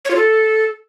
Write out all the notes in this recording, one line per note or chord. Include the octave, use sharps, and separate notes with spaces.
C#5
F4
A4